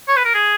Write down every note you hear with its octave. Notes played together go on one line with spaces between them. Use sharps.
C#5
B4
A#4
G#4